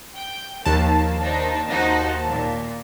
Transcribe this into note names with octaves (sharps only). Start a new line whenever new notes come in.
G5
D#2 F3 A#3 A5
D4 D#4 C5
D#4 F#4 C5
A#2